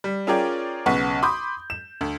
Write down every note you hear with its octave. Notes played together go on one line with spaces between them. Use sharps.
G3
C#4 F4 G#4 A#4 D5 G5
B1 C#3 B4 F#5 C#6
B5 C6 D6 D#6 G6
E7
D2